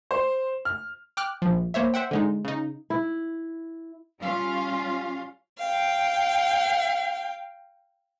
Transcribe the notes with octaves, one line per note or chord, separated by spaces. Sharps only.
C5
F6
G5 D6 F6 F#6
A#1 F3
A#3 C5 C#5 E5
C5 E5 F#5 G5
D3 G#3 D#4
C#3 D#4
E4
G3 C#4 F4 F5
F5 G5